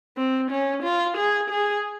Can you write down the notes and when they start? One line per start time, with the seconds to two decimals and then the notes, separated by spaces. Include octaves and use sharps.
0.17 C4
0.50 C#4
0.83 F4
1.17 G#4
1.50 G#4